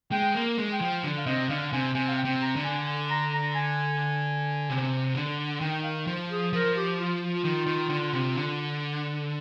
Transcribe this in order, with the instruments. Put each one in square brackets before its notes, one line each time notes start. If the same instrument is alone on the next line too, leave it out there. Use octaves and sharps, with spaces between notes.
[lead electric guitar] G#3 [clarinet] G5
[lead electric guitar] A#3
G#3
[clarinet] G5
[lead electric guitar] F3
D3
[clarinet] F5
[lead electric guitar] C3 [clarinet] D#5
[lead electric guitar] D3 [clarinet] F5
[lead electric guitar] C3 [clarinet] G#5
[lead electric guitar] C3 [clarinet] G#5
[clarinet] F5
G5
[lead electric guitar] C3
[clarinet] A#5
[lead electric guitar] D3
[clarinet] G#5
G#5
A#5
A#5
G#5
[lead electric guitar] C3
D3
[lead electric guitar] D#3 [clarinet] G5
[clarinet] F5
[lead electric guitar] F3
[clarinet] G#4
[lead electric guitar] F3 [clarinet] A#4
[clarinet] G4
F4
F4
[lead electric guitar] D#3
D#3
D3
C3
D3